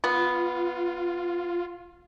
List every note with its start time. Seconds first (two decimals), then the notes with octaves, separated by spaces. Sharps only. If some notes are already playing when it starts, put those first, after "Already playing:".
0.04 B3 F4